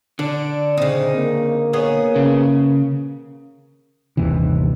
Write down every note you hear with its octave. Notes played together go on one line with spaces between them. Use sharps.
D3 D4
C#3 C4 D#4
A#3
B3 G#4 C#5
C#3
G1 D#2 C3 E3